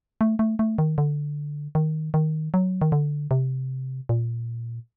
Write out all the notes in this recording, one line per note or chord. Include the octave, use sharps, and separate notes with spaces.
A3
A3
A3
D#3
D3
D#3
D#3
F#3
D#3
D3
C3
A#2